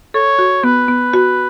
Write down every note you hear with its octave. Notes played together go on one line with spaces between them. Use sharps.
A4 C#5
F#4
B3 B4
B3
F#4